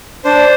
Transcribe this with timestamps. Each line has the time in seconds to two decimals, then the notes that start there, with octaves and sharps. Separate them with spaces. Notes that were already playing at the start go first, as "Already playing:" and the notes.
0.24 D4 C5